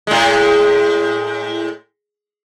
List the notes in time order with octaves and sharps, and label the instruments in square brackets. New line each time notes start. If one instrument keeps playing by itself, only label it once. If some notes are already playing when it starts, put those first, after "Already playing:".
[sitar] A2 G#3